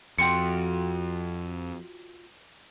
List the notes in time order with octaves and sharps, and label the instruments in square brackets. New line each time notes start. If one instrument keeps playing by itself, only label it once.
[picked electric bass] F2 [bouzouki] F4 F#4 G5 [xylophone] C#7